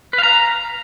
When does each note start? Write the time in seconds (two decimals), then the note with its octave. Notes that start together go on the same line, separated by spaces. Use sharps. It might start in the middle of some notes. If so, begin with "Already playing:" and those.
0.13 B4
0.18 F5
0.23 A#5